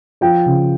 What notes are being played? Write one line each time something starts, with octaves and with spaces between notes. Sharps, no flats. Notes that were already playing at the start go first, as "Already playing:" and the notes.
F3 G5
C#3